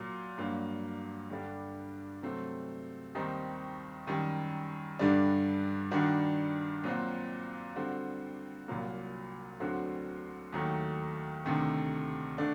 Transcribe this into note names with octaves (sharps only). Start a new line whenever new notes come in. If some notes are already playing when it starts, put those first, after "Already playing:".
Already playing: A#2 F#3 A#3
G2 F#3 A#3
G2 D3 G3 D4 G4
C3 F#3 A3 C4
D#2 D#3 G3 C4 D#4
F#2 D#3 G3
G2 D3 G3 D4
G2 D#3 G3 D4 F#4
A#2 F#3 C4 F#4
D3 G3 C4 F#4
C2 A#2 F#3 A#3
D2 D3 F#3 C4 F#4
D#2 D#3 F#3 A3
D2 C3 D#3 A3
D3 A3 D4